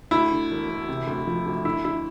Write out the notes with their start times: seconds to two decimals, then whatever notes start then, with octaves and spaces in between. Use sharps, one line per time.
0.11 D2 E4
0.32 D3
0.51 E1
0.69 E1
0.88 C3
1.07 D2
1.27 F3
1.46 D2
1.65 D3 E4
1.84 D3 E4